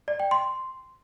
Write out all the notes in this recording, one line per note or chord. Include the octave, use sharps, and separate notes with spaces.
D5
G5
C6